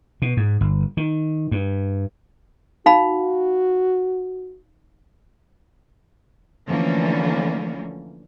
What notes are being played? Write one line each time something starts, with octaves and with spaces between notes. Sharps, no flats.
B2
G#2
G1
D#3
G2
D#4 F#4 F5 B5
D3 E3 F3 A3 A#3 C#4